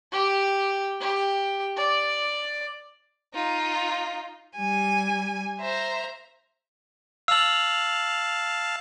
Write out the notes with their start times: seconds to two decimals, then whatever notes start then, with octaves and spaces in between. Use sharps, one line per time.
0.12 G4
1.01 G4
1.77 D5
3.34 D#4 F4
4.58 G3 G#5
5.59 C5 E5 A#5
7.28 F5 A5 E6 F7 F#7